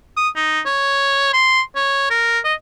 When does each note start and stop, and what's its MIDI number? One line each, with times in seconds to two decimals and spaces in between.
0.17 0.29 87
0.36 0.61 63
0.66 1.32 73
1.33 1.61 84
1.76 2.09 73
2.10 2.39 70
2.44 2.54 75